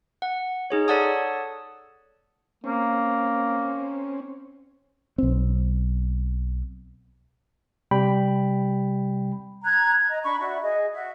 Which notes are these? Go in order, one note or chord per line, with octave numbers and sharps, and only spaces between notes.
F#5
D#4 G#4 C#5
A4 C#5 D5 F#5 A5 D#6
A#3 C4 C#4
B1 C4
C3 G3 G5 B5
A#5 F#6 G#6
D#5 A#5
D4 B5 C#6
F#4 D5 E5
G#4 D#5
F#4 E5